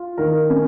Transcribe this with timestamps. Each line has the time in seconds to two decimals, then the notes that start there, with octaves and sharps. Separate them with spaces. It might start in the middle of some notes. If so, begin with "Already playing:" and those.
Already playing: F4
0.18 D#3 A#4
0.50 C#4